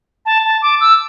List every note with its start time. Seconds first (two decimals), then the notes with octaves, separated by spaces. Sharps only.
0.26 A5
0.45 A5
0.62 D6
0.81 E6